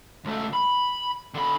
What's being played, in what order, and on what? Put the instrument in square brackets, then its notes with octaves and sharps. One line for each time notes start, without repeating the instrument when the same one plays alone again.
[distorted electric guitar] C#2 A3
B5
D3 B5